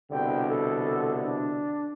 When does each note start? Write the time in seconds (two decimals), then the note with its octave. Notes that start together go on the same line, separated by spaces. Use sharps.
0.11 C2 B2 D3 G5
0.49 A4
1.24 D4